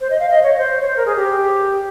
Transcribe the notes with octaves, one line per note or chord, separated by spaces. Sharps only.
C5
D#5
F5
D#5
C#5
C#5
C5
C#5
C5
A#4
G#4
G4